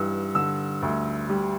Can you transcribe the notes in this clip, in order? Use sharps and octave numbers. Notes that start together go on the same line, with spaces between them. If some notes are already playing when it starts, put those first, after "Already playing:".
Already playing: G2 E3 E6
D3 E6
D2
G3